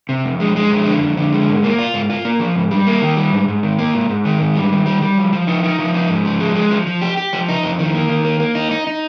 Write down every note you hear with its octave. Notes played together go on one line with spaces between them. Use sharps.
C3
F2
G#3
G#3
F2
D3
F2
D3
G#3
G#2
A#3
F4
G#2
F4
A#3
F3
G#2
G3
A#3
D#3
G3
G#2
G#2
D#3
A#3
G#2
G#2
D#3
G#2
G3
D#3
G3
G3
F3
F3
D#4
D#4
F3
D#4
G#2
F3
G#3
G#3
F3
F3
G4
G4
F3
D#4
F2
D#3
A#3
D#3
A#3
A#3
D#4
D#4
D#4